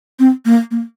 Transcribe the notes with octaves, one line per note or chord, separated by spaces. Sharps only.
C4
A#3
A#3